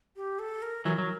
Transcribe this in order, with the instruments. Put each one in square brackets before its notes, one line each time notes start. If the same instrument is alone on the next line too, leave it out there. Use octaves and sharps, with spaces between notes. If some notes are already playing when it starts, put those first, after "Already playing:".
[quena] G4
A4
A#4
[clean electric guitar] E3 F#3 [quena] A#4
[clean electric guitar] F#3